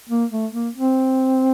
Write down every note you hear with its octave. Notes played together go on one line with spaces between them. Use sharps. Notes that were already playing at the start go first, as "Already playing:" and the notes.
A#3
A3
A#3
C4